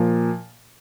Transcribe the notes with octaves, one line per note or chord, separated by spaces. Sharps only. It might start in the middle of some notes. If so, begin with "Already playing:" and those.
Already playing: A#2 F3